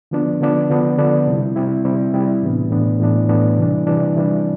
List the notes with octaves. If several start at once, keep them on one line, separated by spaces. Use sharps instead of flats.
D3 F3 B3 D4
D3 F3 B3 D4
D3 F3 B3 D4
D3 F3 B3 D4
C3 G3 C4 E4
C3 G3 C4 E4
C3 G3 C4 E4
C3 G3 C4 E4
A2 E3 B3 D4
A2 E3 B3 D4
A2 E3 B3 D4
A2 E3 B3 D4
C3 E3 G3 D4
C3 E3 G3 D4
C3 E3 G3 D4